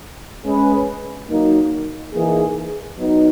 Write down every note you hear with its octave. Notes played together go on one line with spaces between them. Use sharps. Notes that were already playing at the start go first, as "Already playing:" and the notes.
G#3 C#4 G#4 B4
F#3 A#3 D#4
E3 A#3 D#4 G#4
F#3 B3 D#4